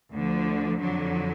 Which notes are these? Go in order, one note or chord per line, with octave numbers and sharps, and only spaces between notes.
D2 D3 F3
F2 D3 F#3